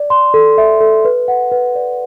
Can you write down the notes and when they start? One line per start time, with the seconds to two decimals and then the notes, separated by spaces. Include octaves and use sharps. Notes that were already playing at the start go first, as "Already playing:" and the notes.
Already playing: D5
0.10 C6
0.34 A4
0.58 E5
0.81 A4
1.05 B4
1.28 F#5
1.52 B4
1.76 D5